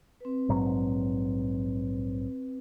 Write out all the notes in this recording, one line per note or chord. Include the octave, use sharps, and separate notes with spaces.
C4 B4
A#1 G#2 F#3